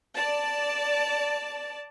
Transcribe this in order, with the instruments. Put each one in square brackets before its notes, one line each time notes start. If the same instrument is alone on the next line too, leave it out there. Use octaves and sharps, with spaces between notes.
[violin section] D5 A5